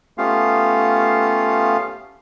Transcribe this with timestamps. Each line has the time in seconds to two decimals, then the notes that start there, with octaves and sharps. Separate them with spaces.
0.18 A3 B3 C#4 F4 G4 F5